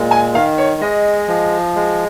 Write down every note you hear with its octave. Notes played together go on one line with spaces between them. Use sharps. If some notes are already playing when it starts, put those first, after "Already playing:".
Already playing: A#2 G#3
G#5
D#3 F5
C#5
G#3 D#5
F3
G#3